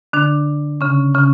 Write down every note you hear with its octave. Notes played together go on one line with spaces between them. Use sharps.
D3 D4
C#3 C#4
C#3 C#4